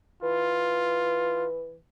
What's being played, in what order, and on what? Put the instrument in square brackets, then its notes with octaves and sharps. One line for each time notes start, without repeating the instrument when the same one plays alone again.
[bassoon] E3 [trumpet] F4